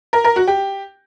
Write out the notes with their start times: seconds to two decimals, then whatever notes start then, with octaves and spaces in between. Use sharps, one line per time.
0.13 A#4
0.24 A#4
0.36 F#4
0.47 G4